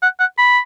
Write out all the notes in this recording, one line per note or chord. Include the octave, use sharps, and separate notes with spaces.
F#5
F#5
B5